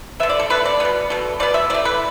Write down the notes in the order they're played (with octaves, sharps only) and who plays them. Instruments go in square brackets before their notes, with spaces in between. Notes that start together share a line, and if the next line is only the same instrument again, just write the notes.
[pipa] D3 B3 E5
D5
A4
D3 B3 B4
D5
B2 B3
B2 A3
B2 B3 D5
E5
E3 A3 D5
B4